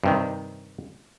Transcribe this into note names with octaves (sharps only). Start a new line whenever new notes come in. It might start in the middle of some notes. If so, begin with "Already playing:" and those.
G2 C3 D#3